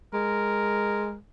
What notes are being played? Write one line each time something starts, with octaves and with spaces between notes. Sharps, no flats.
G#3 A#4